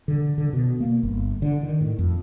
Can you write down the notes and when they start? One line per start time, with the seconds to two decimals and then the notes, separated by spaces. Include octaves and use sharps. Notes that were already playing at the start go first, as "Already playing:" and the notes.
0.08 D3
0.38 D3
0.53 B2
0.80 A#3
1.03 G1
1.42 D3
1.63 D#3
1.81 A2
1.99 F2